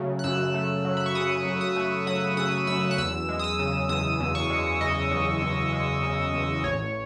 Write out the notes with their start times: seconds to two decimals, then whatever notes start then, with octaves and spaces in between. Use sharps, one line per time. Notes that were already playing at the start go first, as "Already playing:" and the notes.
Already playing: C#3 F#3 A3
0.19 F#6
0.24 F#2 E6
0.54 A3
0.85 F#3
0.97 B5
1.06 C#6
1.15 C#3 D#6
1.45 F#2
1.61 D#6
1.76 A3
2.06 F#3 D#6
2.37 C#3 D#6
2.67 F#2 E6
2.91 F#6
2.98 E2 E6
3.29 G#3
3.39 D#6
3.44 E6
3.59 C#3
3.89 E2 D#6
4.20 E2
4.35 C#6
4.50 G#3
4.81 C#3 D#5
5.11 E2
5.41 E2
5.73 G#3
6.03 C#3
6.33 E2
6.64 A1 C#5